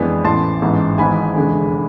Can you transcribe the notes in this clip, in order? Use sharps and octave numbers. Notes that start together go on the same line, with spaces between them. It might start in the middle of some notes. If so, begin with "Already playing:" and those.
Already playing: F2 E3 G#3 B3 D4 G#5 B5
A1 A2 E3 A5 C6
A1 G#2 E3 B3
G#1 G#2 E3 B3 G#5 B5
F1 E2 D3 G#3